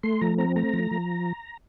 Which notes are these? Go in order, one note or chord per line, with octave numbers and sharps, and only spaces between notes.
A3 C6
F3 A#5
C4 A#5
A3 A#5
F3
F3